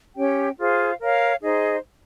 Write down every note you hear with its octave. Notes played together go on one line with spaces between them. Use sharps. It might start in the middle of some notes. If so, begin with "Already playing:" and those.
C#4 G4 C#5 G5
F4 G#4 C5 F5
A#4 C#5 F5
D#4 G#4 C5 D#5